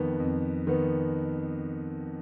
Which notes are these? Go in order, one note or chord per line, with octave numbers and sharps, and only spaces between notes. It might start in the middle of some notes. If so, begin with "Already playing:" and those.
Already playing: F2 D#3 B3
F2
D#3 B3